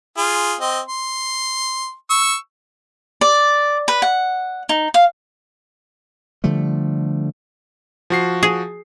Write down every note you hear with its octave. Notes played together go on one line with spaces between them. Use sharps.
F4 G#4
C4 D#5
C6
C#6 E6
D5
B4
F#5
D#4
F5
D3 F3 G3 A3
F3 F#4 C7
G#4